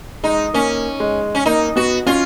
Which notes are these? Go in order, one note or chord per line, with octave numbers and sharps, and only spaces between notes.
G#3 D#4
A#3 C#4
G#3
C#4
A#3 D#4
B3 F#4
C#4 F4